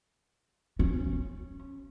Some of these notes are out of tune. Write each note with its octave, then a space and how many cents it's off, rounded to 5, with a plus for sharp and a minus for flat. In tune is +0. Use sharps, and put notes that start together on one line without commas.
C#4 -15